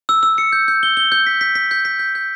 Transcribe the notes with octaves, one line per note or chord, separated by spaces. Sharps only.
E6
E6
C#7
G6
G6
G7
G7
G6
B6
B6
B6
G6
B6
G6
G6